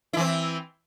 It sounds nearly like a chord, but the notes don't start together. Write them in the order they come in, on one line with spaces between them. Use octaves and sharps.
E4 E3 C4